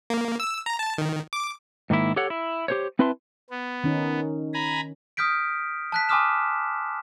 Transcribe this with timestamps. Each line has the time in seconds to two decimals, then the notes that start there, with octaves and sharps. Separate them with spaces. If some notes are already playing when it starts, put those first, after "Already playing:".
0.10 A#3
0.40 E6
0.66 A#5
0.79 A5
0.98 D#3
1.33 D6
1.90 G#2 D#3 A#3 E4
2.16 G4 A4 C#5 F#5
2.30 E4
2.68 G4 C5 C#5
2.99 C4 E4 B4 E5 A5 C6
3.50 B3
3.84 D#3 C#4 D#4
4.54 G#5 A#5 B5
5.17 D#6 F6 G6 B6 D7
5.92 A5 F#6 B6
6.09 G#5 C6 D6 D#6 F6 E7